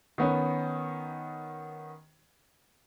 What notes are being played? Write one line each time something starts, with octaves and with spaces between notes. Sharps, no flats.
D#3 B3 C#4